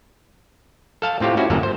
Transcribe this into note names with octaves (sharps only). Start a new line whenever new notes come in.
A4 F5 A5
A2 C4 F4 G4
C#4 E4 F#4
G1 F#2 A#3 A4
C5